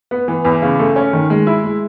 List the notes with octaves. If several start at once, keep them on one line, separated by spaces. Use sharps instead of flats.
B3
E3
E2
C#3
A3
C#4
D#3
G#3
E4
G#3